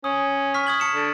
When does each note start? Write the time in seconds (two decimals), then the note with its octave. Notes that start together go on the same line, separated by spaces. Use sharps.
0.04 C#4 D#6
0.54 C#6 F6 B6
0.67 D#6 G#6 F#7
0.80 A5 C#7 E7
0.94 D3